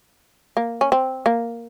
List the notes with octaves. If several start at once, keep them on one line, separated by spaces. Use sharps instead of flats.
A#3
C#4
C4
A#3